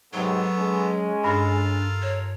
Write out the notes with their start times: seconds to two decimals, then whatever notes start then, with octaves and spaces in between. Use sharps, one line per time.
0.13 G#2 C3 F#3 B3 A4 C#5
0.57 G#3 C#4
1.24 G2 D4 F4 A4 A#4
2.02 C#5